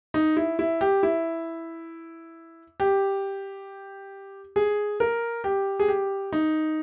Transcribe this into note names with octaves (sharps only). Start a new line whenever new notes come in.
D#4
E4
E4
G4
E4
G4
G#4
A#4
G4
G#4
G4
D#4